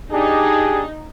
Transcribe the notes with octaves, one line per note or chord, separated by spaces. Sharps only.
D4 D#4 G4 G#4